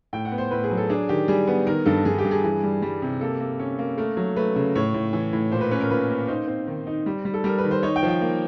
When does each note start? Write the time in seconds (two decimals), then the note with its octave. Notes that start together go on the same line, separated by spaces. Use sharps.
0.13 A2 G5
0.25 F#5
0.32 B3
0.38 C5
0.51 A2 B4
0.64 G#4
0.71 F#3
0.77 A4
0.90 D4 G#4
1.09 D#3 G4
1.28 G3 G#4
1.47 B3
1.67 D#3 A#4
1.86 G2 A4
2.05 G2 G#4
2.18 G4
2.24 G2
2.31 G#4
2.44 E3 G#4
2.63 G3
2.82 G3
3.02 C3
3.21 A#3 A4
3.40 A#3
3.59 C#4
3.79 A#3
3.98 A3 A#4
4.17 F#3
4.36 A3 B4
4.56 C#3
4.75 A2 C#5
4.94 A2
5.13 E3
5.33 A2
5.52 A#2 C5
5.61 B4
5.71 C#4 B4
5.81 A#4
5.91 A#2 B4
6.09 A#3
6.28 D#4 C5
6.47 C4
6.67 D#3
6.87 D#4
7.06 G3
7.25 G3
7.34 A4
7.44 G3 A#4
7.58 B4
7.64 D#3
7.71 C5
7.83 D#4 C#5
7.96 G5
8.03 F3
8.08 G5
8.21 A#3